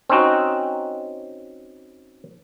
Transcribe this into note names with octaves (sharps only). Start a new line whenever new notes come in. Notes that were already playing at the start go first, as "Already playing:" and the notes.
C4 C#4 D#4 F#4